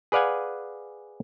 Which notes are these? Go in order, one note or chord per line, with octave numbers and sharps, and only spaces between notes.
G#4 B4 D5 F5 F#5 G#5